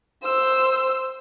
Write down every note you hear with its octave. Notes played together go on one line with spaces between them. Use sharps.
C5 E6